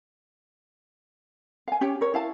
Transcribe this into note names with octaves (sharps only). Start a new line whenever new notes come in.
F5 G#5
C#4 G4 C#5
A#4 C#5
E4 F5 A5